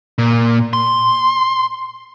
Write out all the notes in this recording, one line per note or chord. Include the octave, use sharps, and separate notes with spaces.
A#2
C6